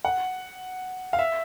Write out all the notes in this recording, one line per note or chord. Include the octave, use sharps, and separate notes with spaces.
F#5
F5
E5